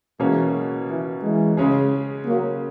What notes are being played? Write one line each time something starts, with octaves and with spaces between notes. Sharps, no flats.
B2 E3 G#3 A#3 C#4
E3
E3 G#3
C#3 G#3 C#4 G#4
F#3 A#3